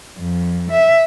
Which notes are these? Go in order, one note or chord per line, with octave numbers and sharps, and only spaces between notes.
F2
E5